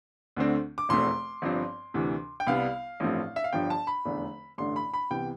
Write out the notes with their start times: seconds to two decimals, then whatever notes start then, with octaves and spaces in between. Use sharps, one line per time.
0.37 D2 D3 A3 C4
0.78 D6
0.89 F1 E2 B2 A3 C4 C6
1.42 G1 G2 F3 C4
1.94 D2 C3 E3
2.40 G5
2.47 C2 C3 G3 B3 F5
3.00 A1 G2 F3 A3 C4
3.36 E5
3.44 F5
3.53 G1 G2 F3 G5
3.70 A5
3.87 B5
4.05 F1 E2 D3 A3
4.58 A1 G2 D3 A3 C6
4.76 B5
4.94 B5
5.10 C2 C3 E3 B3 G5